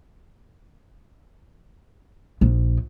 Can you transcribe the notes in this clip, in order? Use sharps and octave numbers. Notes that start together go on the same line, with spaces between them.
A#1